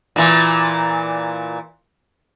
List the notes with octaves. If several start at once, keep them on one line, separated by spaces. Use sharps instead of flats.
A#2 E3